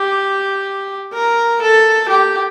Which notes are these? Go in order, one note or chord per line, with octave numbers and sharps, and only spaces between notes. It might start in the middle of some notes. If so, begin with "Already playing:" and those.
Already playing: G4
A#4
A4
G4